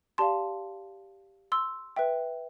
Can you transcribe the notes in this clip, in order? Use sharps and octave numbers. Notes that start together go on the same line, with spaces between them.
G4 D5 F5 A5 C6
C6 E6
B4 E5 G5